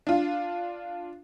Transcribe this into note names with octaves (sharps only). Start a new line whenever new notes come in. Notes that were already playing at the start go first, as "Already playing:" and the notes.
D4 F4